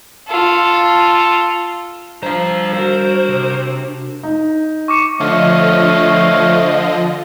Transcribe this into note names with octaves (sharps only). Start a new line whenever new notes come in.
F4 A4
G3 D4 C5 F5 A#5
F#4 A#4 C5
C3
D#4
C#6 D6 C#7
D3 F3 A3 C#5 D#5 F5